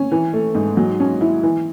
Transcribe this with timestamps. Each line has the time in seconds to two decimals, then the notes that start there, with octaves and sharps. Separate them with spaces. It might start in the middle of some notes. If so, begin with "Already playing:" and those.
Already playing: C#4
0.12 E3
0.33 A3
0.55 G#2
0.77 F#3
1.00 C#4
1.21 E4
1.43 E3